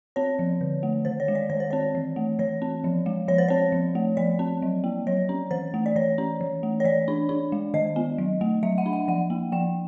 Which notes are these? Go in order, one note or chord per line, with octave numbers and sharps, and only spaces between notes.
C4 C#5
F3
D3
A3
D#3 C5
C#5
G#3
D5
D#3 C#5
C5
C4 C#5
E3
A3
E3 C#5
C4
F3
G#3
F3 C#5
C5
C4 C#5
F3
A3
F3 D5
C4
F#3
A#3
F#3 C#5
C#4
E3 C5
A3
D5
E3 C#5
C#4
E3
A3
C#5
E3 D5
D4
D4
G#3
D#3 D#5
B3
F#3
A3
F#3 E5
F#5
D4
F#5
F3 F#5
A#3
F3 G5